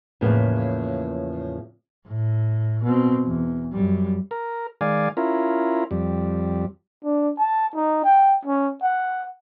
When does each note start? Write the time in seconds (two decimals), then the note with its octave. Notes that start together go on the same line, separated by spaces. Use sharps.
0.21 E2 A2 C#3 F3 A#3 B3
2.07 A2
2.84 B2 C4
3.25 E2
3.73 F#2 G3
4.31 A#4
4.81 D#3 G#3 D5 F5 G#5
5.17 C#4 E4 F4 A#4
5.91 F2 G3
7.04 D4
7.38 A5
7.75 D#4
8.04 G5
8.45 C#4
8.82 F#5